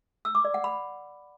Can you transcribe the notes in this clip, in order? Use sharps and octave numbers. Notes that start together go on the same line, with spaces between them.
E6
D6
D5
F#5
B5